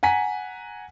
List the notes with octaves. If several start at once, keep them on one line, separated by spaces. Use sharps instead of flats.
F#5 G#5 A#5 B6